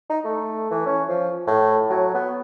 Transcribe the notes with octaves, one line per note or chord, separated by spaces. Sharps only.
D#4
A3
E3
C#4
F3
A2
F#3
B3